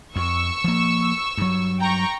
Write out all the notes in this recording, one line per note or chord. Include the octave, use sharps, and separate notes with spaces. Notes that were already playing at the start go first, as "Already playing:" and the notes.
F2 C#6 E6
F3 A#3
G2 F#3
G5 A#5 C#6